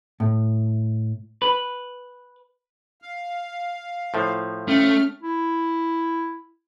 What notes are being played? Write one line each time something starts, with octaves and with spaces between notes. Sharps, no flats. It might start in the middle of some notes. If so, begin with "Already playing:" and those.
A2
B4
F5
A2 F3
A3 C#4 F6
E4